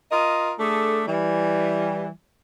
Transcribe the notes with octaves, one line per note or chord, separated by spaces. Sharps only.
F4 A#4 D#5
A3 D4 G#4 A4
E3 G3